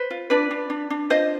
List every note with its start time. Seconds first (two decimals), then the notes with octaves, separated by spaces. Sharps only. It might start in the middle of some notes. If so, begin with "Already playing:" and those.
Already playing: B4 C5
0.10 F4
0.30 D4 B4 D5
0.51 D4
0.70 D4
0.90 D4
1.10 F4 C5 D#5